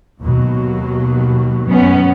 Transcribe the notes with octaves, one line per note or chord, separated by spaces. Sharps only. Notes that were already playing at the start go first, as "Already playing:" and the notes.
D#2 B2 F#3
F#2 B3 C#4